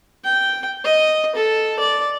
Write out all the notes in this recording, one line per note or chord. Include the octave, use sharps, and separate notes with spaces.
G5
D#5
A4
D5